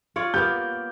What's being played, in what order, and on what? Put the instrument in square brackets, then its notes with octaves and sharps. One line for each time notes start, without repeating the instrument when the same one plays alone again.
[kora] F4 C#5 D5
[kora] A#3 B3 G4 [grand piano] G6